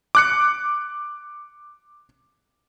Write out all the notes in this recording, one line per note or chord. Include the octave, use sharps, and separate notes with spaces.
D6 F#6 C#7